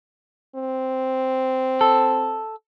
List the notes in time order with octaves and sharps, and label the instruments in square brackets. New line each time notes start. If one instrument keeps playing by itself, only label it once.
[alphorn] C4
[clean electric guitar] A4